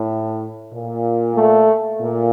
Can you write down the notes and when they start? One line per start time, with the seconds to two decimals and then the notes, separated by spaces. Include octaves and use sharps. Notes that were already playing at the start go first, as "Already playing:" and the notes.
Already playing: A2
0.72 A#2
1.36 A3
2.00 A#2